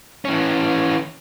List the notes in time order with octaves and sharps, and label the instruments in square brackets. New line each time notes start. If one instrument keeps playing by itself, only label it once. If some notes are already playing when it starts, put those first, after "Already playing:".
[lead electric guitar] E3 C#4